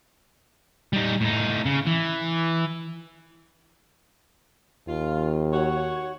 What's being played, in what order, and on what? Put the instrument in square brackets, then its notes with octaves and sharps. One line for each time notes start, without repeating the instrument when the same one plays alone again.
[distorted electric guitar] G3 D#4
A2 D#4
C#3
E3
[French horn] D#2 [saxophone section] F4
[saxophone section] F#4 C#5